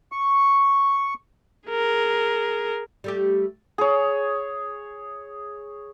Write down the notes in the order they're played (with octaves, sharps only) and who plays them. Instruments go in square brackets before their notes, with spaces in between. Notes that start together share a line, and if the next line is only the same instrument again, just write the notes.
[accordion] C#6
[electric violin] G#4 A#4
[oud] G3 A3 G4
[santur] G#4 C#5